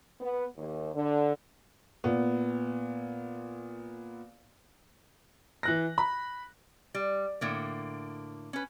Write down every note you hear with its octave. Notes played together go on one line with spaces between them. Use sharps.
B3
D#2
D3
A#2 B3
E3 F#6 A#6
B5
G3
A2 D3 A#3
C#4 B4